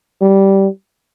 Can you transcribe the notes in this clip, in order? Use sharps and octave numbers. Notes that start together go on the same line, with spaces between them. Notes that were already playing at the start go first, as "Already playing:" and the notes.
G3